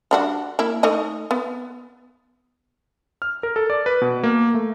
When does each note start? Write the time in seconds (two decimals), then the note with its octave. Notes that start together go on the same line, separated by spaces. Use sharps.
0.11 G3 D4 F#4
0.59 A#3 E4
0.83 A3 D#4 D#5
1.31 B3
3.22 F6
3.43 A#4
3.56 A4
3.70 D5
3.86 B4
4.02 B2
4.23 A#3
4.54 A3